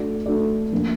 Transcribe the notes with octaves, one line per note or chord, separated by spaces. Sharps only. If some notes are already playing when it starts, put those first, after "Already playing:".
Already playing: A3 D4 F#4 A4 D5
A3 D4 F#4 A4 D5
F3 A#3 D4